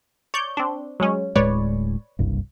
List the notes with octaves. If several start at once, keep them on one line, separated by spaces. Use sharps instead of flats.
C#5 D5 G6
C4 D4
F#3 G#3 C#4
D1 A2 G#3 B4 C#5 D5
F#1 C2 G2